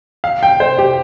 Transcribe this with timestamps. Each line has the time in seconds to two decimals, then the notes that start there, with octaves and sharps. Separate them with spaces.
0.24 F5
0.43 G5
0.60 C5
0.79 G4